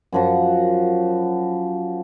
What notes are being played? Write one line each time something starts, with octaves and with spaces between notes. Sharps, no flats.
F#2 F3 F#4